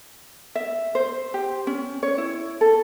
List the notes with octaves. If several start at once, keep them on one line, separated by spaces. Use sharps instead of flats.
E5
C5
G4
C#4
C#5
E4
A4